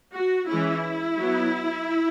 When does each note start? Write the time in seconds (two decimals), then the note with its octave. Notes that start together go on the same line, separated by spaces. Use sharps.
0.14 F#4
0.49 E3 G#3 C#4 E4
1.19 F#3 B3